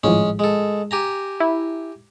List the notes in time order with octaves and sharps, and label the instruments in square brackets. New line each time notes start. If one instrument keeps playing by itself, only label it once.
[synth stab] G#1 A2 F3 [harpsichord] G#3 C#4
[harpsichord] G#3 A4
G4 G#5 A#5
[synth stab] E4